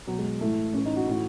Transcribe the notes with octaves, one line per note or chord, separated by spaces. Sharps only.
B2 F#3
G#3
A2 E3 A3
A2 E3 C#4
D#4
F#4
A2 E3